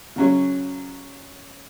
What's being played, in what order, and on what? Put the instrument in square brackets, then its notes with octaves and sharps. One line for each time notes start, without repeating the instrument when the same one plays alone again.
[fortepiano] C#3 F#3 C#4